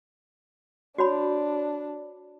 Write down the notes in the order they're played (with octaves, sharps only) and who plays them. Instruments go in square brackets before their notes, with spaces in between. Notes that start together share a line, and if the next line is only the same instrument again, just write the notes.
[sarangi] D4 [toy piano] F#4 C#5 B5